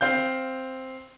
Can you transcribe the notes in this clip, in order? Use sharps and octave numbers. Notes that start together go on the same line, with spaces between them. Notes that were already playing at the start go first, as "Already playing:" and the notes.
C4 F5 G6